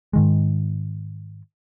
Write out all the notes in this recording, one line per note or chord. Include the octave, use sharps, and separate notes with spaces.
G#2 D#3 G#3